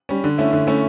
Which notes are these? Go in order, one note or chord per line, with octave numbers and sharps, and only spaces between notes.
G3 C#4
D3
A3 C#4 E4
D3
A3 C#4 E4